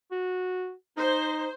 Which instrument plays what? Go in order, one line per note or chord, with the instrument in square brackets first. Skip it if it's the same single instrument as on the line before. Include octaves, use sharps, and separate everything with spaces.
[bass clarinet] F#4
[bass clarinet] D#4 [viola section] C5